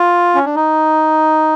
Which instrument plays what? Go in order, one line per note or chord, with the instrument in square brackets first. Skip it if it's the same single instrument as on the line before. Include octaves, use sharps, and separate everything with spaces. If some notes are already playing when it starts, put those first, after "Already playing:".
Already playing: [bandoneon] F4
C#4
D4
D#4